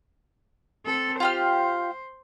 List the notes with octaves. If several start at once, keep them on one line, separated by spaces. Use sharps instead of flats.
C4 A4
F4 G4 C5 F6